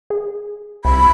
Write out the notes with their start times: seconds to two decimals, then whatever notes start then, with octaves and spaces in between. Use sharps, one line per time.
0.10 G#4
0.85 C2 B5